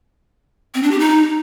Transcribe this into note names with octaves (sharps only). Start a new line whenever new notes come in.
C4
D4
G4
D#4